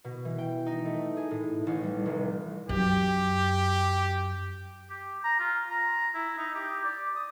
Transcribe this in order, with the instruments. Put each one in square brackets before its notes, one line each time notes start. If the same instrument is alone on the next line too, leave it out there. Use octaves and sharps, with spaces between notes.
[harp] B2
E3
G5
D#4
A3
G#4
A2
A1
G3
F1
[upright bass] F#2 [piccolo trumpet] G4
[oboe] G4
A#5
F4
A#5
E4
D#4
G4
D5
D#6